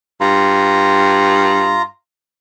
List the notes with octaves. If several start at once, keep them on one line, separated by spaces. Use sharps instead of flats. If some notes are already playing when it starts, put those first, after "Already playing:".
G2 F4 A#5